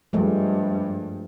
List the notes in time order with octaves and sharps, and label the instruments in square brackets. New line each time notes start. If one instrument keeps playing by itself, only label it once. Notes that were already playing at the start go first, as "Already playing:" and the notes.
[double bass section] G2 [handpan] F3 G#3 A3